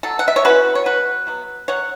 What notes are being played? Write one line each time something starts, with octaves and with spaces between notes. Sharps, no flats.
F#3 A4
F#5
E5
C#5
C#4 E4 F#4 B4
C#5
B2 F#4 B4
F#3 B3
F#3 C#5 F#5